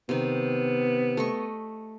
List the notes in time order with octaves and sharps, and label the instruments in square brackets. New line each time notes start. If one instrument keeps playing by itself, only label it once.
[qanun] C3 D#3 [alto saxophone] B3
[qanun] A3 D#5 C#6